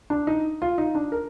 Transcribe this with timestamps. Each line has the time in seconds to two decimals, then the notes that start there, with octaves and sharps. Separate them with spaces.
0.10 D4
0.27 D#4
0.62 F4
0.78 D#4
0.95 D4
1.12 A#4